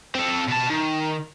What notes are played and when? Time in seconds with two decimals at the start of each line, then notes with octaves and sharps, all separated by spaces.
0.15 C4 A4
0.48 B2 A5
0.70 D#3